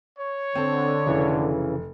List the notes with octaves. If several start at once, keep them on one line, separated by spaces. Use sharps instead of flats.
C#5
D3 C4 A4
F1 C#3 E3